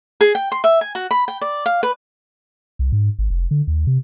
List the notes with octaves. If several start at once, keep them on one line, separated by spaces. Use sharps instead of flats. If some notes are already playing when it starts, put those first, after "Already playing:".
G#4
G5
C6
E5
G#5
F#4
B5
G5
D5
F5
B4
C2
G#2
G#1
F1
D3
D#2
C3